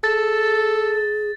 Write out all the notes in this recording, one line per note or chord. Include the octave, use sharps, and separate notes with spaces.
G#4 A4 A6